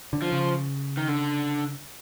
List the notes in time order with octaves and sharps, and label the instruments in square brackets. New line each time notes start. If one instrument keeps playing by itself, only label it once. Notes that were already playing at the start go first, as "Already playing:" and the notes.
[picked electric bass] D3
[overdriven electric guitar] F3
[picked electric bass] C#3
[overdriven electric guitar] D#3
D3